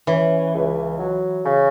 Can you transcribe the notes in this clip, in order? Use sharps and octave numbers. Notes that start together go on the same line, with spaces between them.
E3 C#4
C#2
F#3
C#3